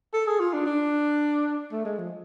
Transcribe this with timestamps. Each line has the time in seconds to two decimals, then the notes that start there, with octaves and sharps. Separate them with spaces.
0.13 A4
0.27 G#4
0.40 F4
0.53 D4
0.66 D4
1.72 A3
1.85 G#3
1.99 F3